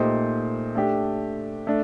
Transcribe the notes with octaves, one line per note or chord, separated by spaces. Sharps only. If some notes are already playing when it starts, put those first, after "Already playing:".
Already playing: A#2 A3 D#4 G4 C5
A3 D4 G4
A3 D4